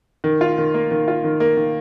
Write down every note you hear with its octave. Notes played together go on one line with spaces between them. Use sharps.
D#3
F4
D#3
A#3
D#3
F4
D#3
A#3
D#3